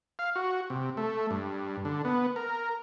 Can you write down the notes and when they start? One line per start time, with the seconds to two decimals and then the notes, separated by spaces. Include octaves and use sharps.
0.19 F5
0.36 F#4
0.70 C3
0.97 A3
1.31 G2
1.85 D3
2.05 B3
2.36 A#4